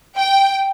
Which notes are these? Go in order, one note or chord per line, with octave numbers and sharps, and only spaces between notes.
G5